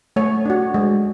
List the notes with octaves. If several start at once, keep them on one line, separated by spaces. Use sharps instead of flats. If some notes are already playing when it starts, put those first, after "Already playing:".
A3 C#5
D4 F#4
G#3